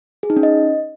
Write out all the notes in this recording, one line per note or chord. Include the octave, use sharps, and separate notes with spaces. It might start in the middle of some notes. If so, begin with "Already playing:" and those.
G#4
D#4
C#4
D#5